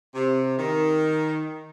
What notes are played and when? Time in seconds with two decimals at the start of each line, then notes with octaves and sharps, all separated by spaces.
0.15 C3
0.58 D#3